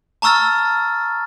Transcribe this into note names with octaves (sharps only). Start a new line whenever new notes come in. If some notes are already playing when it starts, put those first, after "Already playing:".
A5 A#5 C#6 E6 F6 A6